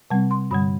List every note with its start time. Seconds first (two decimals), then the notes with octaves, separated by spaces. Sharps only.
0.10 C3 G3 C4 A5
0.31 C6
0.51 G2 D3 G3 B5